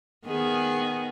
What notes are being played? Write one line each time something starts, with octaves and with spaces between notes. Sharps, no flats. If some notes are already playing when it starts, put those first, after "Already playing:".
D#3 B3 G#4